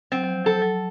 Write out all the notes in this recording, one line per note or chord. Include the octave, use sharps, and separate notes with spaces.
F#3 C4
F#3
F3
F#3 A4
F#3